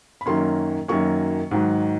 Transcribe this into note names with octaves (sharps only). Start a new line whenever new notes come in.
B5
F#2 D#3 F#3 A#3 C#4 C6
F#2 D#3 F#3 A#3 C#4 C#6
G#2 D#3 F#3